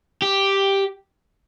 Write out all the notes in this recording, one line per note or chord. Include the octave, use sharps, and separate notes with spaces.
G4